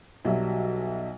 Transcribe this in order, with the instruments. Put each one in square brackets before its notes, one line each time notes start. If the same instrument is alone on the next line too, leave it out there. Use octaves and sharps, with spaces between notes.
[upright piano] B1 F#3 G3 E5